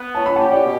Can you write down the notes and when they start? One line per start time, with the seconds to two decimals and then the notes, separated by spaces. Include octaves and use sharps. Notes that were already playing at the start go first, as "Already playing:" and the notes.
Already playing: B3
0.15 C#4 A5
0.26 B5
0.36 F#5 A5
0.39 G4
0.51 D5 F#5
0.64 B2